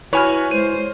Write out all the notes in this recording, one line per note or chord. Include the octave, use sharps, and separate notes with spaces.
E4 F#4 B4 C#5 G#5 F6
G#3 C5 D#7